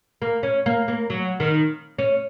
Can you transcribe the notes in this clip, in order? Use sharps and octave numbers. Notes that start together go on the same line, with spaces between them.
A#3
C#4
A#3
A#3
F#3
D#3
C#4